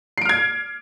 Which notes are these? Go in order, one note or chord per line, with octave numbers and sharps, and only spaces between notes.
F6 G#6 C7 D7